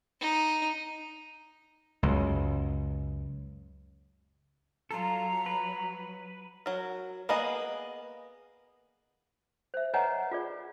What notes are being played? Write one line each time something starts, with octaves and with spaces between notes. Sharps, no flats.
D#4
C#2 F#2
F#3 F4 A4 A#5
B4
F#3 A#4
A#3 B3 G#4 D#5
C5 E5
B4 C#5 D#5 F#5 G#5 A#5
F4 G#4 D5